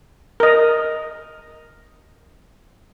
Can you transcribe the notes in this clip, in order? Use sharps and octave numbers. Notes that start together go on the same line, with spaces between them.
A#4 D#5